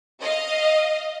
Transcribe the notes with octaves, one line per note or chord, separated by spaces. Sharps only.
D#5 F5